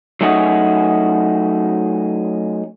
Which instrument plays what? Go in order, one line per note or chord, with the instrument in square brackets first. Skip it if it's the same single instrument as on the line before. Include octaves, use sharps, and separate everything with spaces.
[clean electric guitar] F#3 A3 C#4 D#4 F#4 G#4